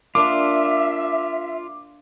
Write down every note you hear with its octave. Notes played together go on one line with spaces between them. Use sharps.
A#3 D4 F4 E5 D6